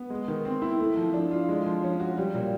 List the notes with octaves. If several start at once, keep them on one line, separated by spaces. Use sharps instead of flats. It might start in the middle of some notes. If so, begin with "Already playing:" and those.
Already playing: B3
G#3
D#3
C4
E4
A3
F3
D4
F4
G#3
F3
C#4
F#4
G3
A#2